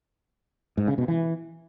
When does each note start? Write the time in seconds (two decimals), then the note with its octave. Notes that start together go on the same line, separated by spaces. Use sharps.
0.77 G#2
0.88 C#3
0.98 B2
1.08 E3